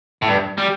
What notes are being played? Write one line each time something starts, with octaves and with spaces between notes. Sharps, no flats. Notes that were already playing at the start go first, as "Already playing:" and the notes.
A2
G2
G3